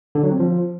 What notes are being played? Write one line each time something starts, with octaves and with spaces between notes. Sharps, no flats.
D3
F#3
C4
F3